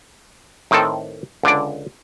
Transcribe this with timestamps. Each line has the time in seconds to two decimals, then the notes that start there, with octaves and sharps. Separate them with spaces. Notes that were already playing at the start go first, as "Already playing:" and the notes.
0.71 A2 D#3 C4 A4
1.43 C#2 D3 D4 D5